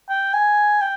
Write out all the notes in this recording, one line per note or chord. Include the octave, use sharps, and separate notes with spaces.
G5
G#5
G5